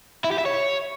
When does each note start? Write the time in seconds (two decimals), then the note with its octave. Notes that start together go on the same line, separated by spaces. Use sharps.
0.24 E4
0.31 G4
0.38 E5
0.46 C#5